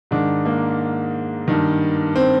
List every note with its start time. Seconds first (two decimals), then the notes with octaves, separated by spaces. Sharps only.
0.11 G#2 D#3 D4
0.46 A#3
1.48 G2 D#3
2.16 C4